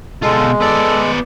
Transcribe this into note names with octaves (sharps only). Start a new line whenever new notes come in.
B2 G#3 F4 A4
B3 A4 D5